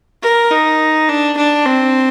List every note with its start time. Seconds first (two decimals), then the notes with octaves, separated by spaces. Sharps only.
0.22 A#4
0.51 D#4
1.08 D4
1.37 D4
1.66 C4